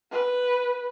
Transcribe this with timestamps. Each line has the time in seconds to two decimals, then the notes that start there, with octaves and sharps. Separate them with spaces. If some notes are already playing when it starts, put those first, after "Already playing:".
0.11 B4